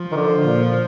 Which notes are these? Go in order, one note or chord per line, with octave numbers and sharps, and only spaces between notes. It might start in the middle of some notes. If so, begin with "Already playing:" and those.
Already playing: F3
D#3
D3
A#2